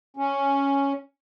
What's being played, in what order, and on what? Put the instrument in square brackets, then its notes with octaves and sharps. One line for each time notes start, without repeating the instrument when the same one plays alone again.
[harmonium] C#4